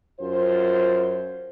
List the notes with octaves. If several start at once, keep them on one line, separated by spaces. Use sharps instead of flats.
F#2 F4 C5